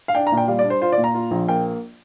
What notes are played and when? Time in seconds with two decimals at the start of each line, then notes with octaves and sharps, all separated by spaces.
0.08 F5
0.15 D4 G5
0.27 A#5
0.32 A#2
0.37 G5
0.48 G3 F5
0.59 D5
0.64 D4
0.70 C5
0.81 F4 C5
0.92 D5
0.98 A#2
1.04 A#5
1.14 F4
1.31 A#1
1.48 A#3 G5